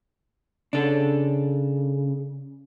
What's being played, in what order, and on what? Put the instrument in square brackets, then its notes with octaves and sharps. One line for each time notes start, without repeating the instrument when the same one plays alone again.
[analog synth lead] C#3 [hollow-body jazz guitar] D4 A4